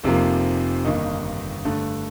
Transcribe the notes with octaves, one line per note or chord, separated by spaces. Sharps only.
F1 F2 C3 F3 A#3
G1 G2 D#3 A#3 D#4
G2 D3 A3